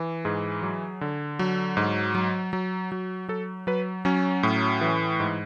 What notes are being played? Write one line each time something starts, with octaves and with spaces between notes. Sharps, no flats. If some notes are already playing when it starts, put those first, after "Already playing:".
Already playing: E3
G#2 G#4
F#3
D3
F#3
G#2
F#3
F#3
F#3
F#3 A4
F#3 B4
F#3 C#4
A2
E3
G#2